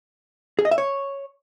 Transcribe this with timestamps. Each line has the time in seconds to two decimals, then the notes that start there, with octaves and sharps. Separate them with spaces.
0.59 G#4
0.65 D#5
0.71 E5
0.78 C#5